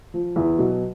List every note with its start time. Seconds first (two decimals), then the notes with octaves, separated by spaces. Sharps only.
0.14 F3
0.36 E2 E4
0.58 B2 F#3